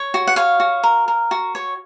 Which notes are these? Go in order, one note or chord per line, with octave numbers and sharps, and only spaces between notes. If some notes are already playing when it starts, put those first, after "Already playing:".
Already playing: C#5
F#4
F#5
C#5 F5
F#4
A#4
A#4
F#4
C#5